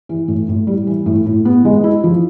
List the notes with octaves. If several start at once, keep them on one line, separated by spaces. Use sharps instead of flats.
E3
A2
A2
G3
E3
A2
A2
B3
G#3
E4
F3